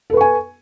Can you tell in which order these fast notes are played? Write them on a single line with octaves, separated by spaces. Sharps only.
A4 B4 C#6 G#5